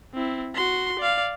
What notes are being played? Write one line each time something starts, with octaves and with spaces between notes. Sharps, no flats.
C4 E4
F#4 C6
D5 F5